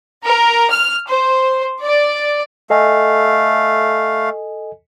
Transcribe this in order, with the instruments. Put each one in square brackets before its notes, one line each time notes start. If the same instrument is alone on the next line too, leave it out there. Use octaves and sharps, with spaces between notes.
[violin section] A#4
F6
C5
D5
[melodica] A3 F5 [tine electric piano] A4 D#5 G#5